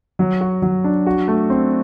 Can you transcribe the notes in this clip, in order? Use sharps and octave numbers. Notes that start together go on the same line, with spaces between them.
F#3
F#4
F#3
D4
F#4
A3
C4